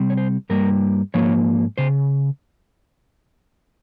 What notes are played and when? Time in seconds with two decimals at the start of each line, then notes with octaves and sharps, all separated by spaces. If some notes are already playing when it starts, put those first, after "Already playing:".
Already playing: C3 G3 C4
0.10 C#5
0.17 C5
0.50 G2 G3 A#3 A#4
1.14 G#2 F3 A#3 C#5
1.78 C#3 C5